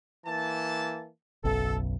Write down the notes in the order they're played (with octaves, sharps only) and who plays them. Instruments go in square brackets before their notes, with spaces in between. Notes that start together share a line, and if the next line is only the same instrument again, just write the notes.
[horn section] E3 A#3 A5
[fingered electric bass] F#1 B1 F#2 [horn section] A4